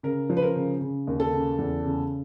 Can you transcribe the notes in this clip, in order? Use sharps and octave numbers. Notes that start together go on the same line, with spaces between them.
C#3 A#4
F3
B4
A#4
C#3
C#3
D#2
A4
C#3
E2
C#3